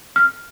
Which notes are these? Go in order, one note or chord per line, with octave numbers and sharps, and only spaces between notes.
F6